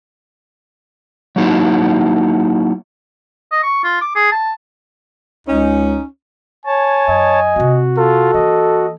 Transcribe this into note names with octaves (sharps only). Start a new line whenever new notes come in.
F#3 A#3 D#4 E4 F#4
D#5
C#6
F4
D6
G#4
A5
C#2 C#4 D#4
C#5 G#5 A5
F#2 D#5
C3 C4 F#4
F4 A4
E3 A#3 D#5